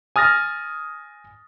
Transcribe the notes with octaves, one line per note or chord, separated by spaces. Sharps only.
G#5 D#6 F6 A6 A#6